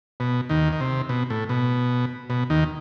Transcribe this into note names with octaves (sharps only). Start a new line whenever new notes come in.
B2
D#2 D#3
D#3
C3
B2
A2
B2
B2
D#2 D#3